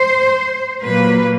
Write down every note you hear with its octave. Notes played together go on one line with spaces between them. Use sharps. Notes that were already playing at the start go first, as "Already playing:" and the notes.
Already playing: C5
A#2 F#3 A#3 B4